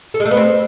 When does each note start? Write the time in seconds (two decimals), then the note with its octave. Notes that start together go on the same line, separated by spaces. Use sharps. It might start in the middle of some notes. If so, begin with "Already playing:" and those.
0.14 A4
0.20 G#3
0.26 A3
0.31 B3
0.37 C4